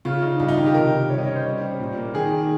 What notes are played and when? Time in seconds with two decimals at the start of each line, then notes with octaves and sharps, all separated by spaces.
0.05 C#3 F4
0.22 D#4
0.40 G2 F4
0.48 D#4
0.57 D#3 F4
0.66 G4
0.74 C3 A#4
0.92 C3
1.10 G3 C#5
1.18 D#5
1.27 C#4 C#5
1.36 C5
1.44 G3
1.61 G3
1.79 A#2
1.97 A#3
2.14 D#3 G#4
2.32 D#3